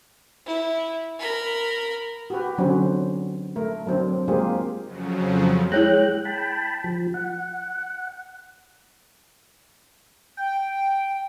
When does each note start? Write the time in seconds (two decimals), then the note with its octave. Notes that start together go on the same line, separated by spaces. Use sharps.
0.46 E4
1.19 A#4 B5
2.30 F#4 G4 B4
2.58 D3 F#3 C4 C#4
3.56 A3 A#4
3.87 F#3 C4 D4
4.28 G#3 A#3 C4 F4 G4 G#4
4.84 F2 C#3 F3 F#3
5.72 G#3 E4 C#5 G5 F#6 A#6
6.25 G5 A5 B5
6.84 F3
7.14 F#5
10.37 G5